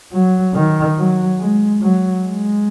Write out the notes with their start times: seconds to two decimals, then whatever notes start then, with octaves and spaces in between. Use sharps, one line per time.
0.13 F#3
0.55 D#3
0.97 F#3
1.39 G#3
1.81 F#3
2.23 G#3